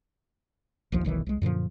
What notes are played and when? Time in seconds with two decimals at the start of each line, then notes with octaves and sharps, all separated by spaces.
0.92 A#1 D#2 F3
1.05 F1 B1 D#3 E3
1.26 C2 G#3
1.42 F#2 A#2 D3 F3